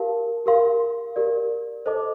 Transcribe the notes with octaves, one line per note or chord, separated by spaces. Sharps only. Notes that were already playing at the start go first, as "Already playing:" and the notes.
Already playing: G4 A#4 F5 A5
G4 A#4 F5 C6
G4 A#4 D5
A4 C5 D#5 A5 D6